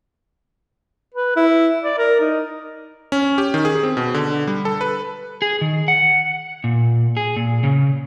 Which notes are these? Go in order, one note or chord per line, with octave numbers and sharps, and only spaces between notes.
B4
E4
D5
A#4
D#4
C#4
G4
D#3
G#4
C4
B2
D3
G3
A4
B4
G#4
D#3
F#5
A#2
G#4
A#2
C#3